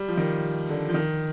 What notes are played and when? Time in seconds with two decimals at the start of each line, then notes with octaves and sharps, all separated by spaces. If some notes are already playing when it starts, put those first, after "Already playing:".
Already playing: G3
0.08 F3
0.17 D#3
0.69 D3
0.89 F3
0.94 D#3